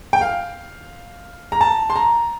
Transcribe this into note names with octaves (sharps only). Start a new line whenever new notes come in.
G5
F5
A#5
A5
C6
A#5